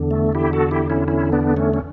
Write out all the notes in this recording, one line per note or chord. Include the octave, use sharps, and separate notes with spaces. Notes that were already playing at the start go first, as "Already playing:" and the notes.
Already playing: E2 D3
A3
E4 G4
F#4 A4
E4 G4
C#4 E4
C#4 E4
B3 D4
A3 C#4
C#4